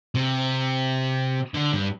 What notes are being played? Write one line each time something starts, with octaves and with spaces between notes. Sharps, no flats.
C3
D3
G2